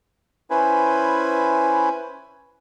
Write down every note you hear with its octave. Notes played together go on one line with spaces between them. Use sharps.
C#4 E4 B4 C5 G#5